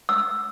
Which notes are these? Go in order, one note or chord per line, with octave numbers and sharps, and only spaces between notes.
E6